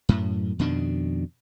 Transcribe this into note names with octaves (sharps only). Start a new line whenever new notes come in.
F#2 A2
F2 B2 D#3 D4